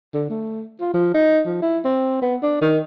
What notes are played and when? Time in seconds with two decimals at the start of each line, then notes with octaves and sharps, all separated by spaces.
0.14 D3
0.30 A3
0.80 F4
0.94 F3
1.14 D#4
1.45 F3
1.62 E4
1.85 C4
2.22 B3
2.43 D4
2.61 D#3